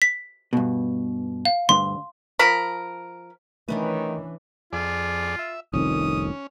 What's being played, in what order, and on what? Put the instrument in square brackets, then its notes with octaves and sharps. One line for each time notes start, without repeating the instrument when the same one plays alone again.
[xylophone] B6
[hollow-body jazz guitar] G2 B2
[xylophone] F5
[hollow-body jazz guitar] D2 G2 D3 [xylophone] C6
[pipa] F3 A#4 B5
[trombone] D#3 [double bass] E3 [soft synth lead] A3 [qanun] C#4 D4 B4
[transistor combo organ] F2 G#4 D5 [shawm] F4
[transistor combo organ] E5
[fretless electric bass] F1 C2 F2 [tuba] D#3 [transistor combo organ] C#4 [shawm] D#6